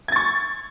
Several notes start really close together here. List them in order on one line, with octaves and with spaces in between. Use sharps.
G#6 A6 C#6